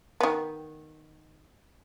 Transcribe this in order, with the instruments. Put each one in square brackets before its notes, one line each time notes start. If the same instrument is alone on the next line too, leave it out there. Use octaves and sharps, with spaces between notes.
[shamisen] D#3 B3